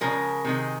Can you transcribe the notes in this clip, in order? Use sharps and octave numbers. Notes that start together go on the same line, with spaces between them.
C#3 F3 G#3 A#4
C3 D#3 G#3